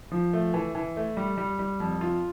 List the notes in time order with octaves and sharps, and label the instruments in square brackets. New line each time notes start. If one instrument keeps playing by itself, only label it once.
[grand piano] F3
A3
E3
E3
A3
G3
G3
G3
F2
F4